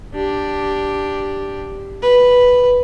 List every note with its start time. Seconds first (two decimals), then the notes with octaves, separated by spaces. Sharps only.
0.14 D4 G4
2.02 B4